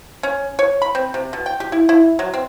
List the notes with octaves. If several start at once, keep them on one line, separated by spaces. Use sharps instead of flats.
C#4
C#5
B5
C4
C3
B2
G5
G4
E4
E4
F#3
C4